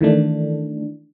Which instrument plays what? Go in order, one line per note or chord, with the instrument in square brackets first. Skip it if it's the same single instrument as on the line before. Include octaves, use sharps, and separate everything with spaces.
[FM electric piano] D#3 E3 A3 D4